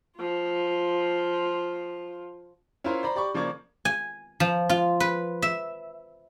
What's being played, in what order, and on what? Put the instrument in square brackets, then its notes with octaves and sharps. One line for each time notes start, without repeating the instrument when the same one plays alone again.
[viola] F3 F4
[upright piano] C#4 E4 F4 A#4 C5
C5 D5 A#5 B5
G4 D5 B5 C#6
C#3 F3 A#3 D5 C#6 G#6
[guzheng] G#5
F3
F4
B4
E5